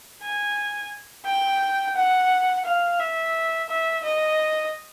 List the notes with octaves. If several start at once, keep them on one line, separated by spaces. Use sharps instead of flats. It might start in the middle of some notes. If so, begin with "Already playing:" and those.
G#5
G5
F#5
F5
E5
E5
D#5